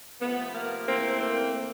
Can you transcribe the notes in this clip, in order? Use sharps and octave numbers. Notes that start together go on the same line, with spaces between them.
C3 F3 A3 B3
A#3
G#2 E3 A3 A#3 C4
A#3 C4